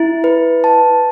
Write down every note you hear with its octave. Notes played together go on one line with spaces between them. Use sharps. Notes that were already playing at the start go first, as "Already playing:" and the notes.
Already playing: E4
B4
A5